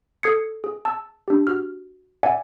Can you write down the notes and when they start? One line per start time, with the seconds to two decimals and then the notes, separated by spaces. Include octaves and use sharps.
0.23 A4 D#6 G#6 C7 C#7
0.64 G#4
0.85 A5 E6
1.28 D4 G4
1.47 F#4 F6
2.23 D5 E5 F#5 G#5